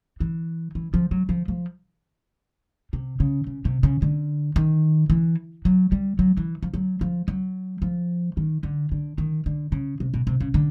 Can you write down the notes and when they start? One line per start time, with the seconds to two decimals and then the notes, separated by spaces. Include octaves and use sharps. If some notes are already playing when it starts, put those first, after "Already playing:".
0.20 E3
0.75 E3
0.94 F3
1.11 F#3
1.29 F3
1.48 F3
2.93 C3
3.20 C#3
3.47 C#3
3.65 C3
3.83 C#3
4.02 D3
4.56 D#3
5.10 E3
5.65 F#3
5.92 G3
6.19 F#3
6.37 E3
6.63 F3
6.74 F#3
7.01 F3
7.28 F#3
7.82 F3
8.37 D#3
8.63 D3
8.92 D3
9.18 D#3
9.46 D3
9.72 C#3
10.00 C3
10.14 B2
10.27 C3
10.40 C#3
10.54 D3